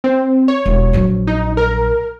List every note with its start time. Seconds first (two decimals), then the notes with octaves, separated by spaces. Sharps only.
0.04 C4
0.48 C#5
0.66 E1
0.93 A#1 F#3
1.27 D#4
1.57 A#4